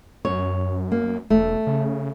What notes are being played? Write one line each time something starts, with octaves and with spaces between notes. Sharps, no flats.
F#2 C#5
A#3
E1 A3
C#3